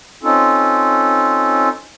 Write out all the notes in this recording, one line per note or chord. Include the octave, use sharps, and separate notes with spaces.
C4 C#4 D#4 F4 A4